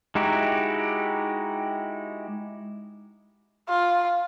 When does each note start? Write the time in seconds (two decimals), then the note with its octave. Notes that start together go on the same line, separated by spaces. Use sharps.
0.15 G#3 D#4 E4 F#4 G4
3.69 F4